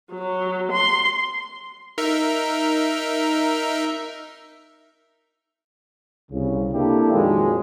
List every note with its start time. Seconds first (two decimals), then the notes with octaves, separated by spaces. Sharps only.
0.10 F#3
0.71 C6
1.98 D#4 A#4 E5
6.31 C2 C#3
6.73 A#3 C4 D4 E4 G4 A4
7.11 F2 A#2 D#3 F#3 G#3